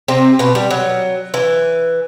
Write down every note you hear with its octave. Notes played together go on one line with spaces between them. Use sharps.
C3 C4
B2 B3
G3
F#3
E3